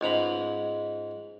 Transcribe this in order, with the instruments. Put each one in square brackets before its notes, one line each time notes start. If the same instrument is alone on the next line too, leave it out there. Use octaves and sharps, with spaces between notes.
[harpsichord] C#2 G#2 A#5 B5